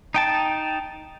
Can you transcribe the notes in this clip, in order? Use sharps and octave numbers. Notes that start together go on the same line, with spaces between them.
D#4 G5 A5